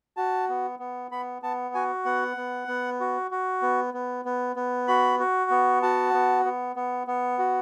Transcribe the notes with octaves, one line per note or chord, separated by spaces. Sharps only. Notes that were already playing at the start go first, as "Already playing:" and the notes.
F#4 A5
B3
B3
B3 B5
B3 A5
F#4 G#5
B3 F#5
B3
B3
F#4
F#4
B3
B3
B3
B3
F#4 B5
F#4
B3
F#4 A5
B3
B3
B3
B3
F#4